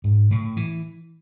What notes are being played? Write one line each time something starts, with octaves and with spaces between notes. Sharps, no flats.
G#2
A2
E3